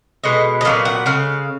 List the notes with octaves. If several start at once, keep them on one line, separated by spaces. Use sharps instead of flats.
B2 G#3 B3 D#5
D#5
A#2 F#3 B3 F5
F#5
C#3 G#3 F5